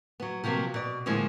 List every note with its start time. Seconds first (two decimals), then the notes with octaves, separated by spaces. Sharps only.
0.20 F#3 B3
0.44 C3 F3 F#3 A#3
0.74 B2 D5
1.06 A2 D3 F3 G#3 A#3